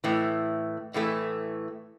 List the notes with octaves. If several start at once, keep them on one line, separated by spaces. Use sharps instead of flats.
A2 E3 A3
A2 E3 A3